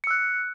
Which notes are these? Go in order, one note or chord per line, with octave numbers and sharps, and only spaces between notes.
E6 F#6 C#7